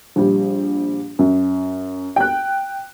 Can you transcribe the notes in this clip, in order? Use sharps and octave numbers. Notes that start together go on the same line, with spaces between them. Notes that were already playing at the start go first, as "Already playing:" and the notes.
A#1 G3
F#2
G5 F#6